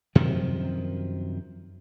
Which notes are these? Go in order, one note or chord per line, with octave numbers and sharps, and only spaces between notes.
F#2 C3 D#3 F3